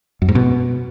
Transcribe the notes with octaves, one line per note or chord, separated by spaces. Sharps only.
F#2
G#2
B2